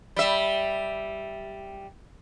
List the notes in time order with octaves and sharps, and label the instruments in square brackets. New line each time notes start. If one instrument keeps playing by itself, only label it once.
[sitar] G3 E5